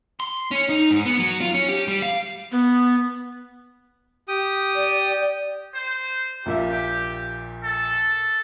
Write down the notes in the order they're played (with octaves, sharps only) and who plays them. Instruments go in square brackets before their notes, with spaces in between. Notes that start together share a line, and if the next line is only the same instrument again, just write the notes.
[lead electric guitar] C6
C#4
D#4
G#2
B3
F#3
F4
C#4
G4
G3
F5
[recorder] B3
[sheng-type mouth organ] G4 G5 D#6
[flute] D5
[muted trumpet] C5
[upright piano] A#1 A#2 E5 [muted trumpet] G4
[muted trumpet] A4